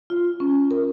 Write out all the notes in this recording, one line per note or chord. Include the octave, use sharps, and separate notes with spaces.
F4
C#4
A#4